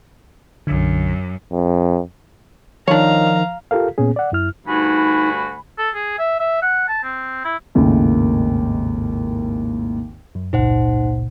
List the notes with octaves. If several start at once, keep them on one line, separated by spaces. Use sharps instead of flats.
B1 F#2 D3
F2
D#3 F3 D4 C#5 F5 A#5
F4 G4 A4 A#4 F5
A#2 B3 C#4 G#4
D5 F#5
F#2 E4 F6
D2 G2 D#4 F#4 G#5 B5
A4
G#4
E5
E5
F#5
A5
C4
E4
G#1 D#2 A2 C#3
F#2
G#1 C#2 A#2 D#4 C5 F#5